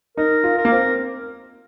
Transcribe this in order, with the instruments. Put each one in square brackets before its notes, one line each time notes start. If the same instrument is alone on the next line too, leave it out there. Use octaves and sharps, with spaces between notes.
[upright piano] D#4 [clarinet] A#4
[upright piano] F4
[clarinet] A#4
[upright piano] A#3
C4